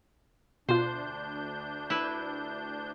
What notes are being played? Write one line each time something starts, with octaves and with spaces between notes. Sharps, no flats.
D2 B2 D4 F4 C5 G6
E4 B4